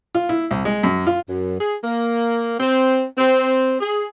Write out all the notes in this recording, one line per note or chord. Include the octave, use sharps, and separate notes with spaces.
F4
E4
C2
G#3
F#2
F4
F#2
G#4
A#3
C4
C4
G#4